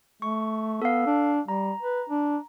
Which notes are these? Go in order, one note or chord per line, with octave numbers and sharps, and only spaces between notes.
A3 C#6
B3 A4 F5
D4
G3 A#5
B4
D4